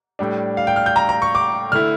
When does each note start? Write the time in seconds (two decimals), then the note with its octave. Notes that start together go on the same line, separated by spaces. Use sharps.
0.19 A2 G3 D4
0.57 F5
0.67 G5
0.76 F6
0.86 G6
0.96 A#5
1.09 A#5
1.22 C#6
1.35 D6
1.72 D3 A3 E4 F6